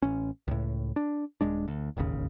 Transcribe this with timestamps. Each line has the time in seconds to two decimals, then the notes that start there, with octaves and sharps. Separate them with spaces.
0.02 A1 C#4
0.48 C#2 A2
0.96 D4
1.41 D#1 G#3 D4
1.68 D2
1.97 E1 A1 D#2 C#3